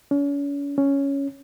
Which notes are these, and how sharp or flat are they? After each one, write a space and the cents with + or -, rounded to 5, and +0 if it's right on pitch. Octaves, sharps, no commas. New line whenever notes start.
C#4 +40
C#4 +5